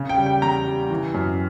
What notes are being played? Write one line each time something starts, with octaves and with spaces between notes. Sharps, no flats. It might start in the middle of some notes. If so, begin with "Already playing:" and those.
Already playing: C#3
G5
G3
G5
E2 A#5
G3
E3
F#2